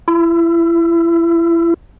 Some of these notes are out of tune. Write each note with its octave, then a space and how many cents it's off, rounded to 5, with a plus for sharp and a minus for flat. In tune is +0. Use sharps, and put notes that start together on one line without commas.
E4 +30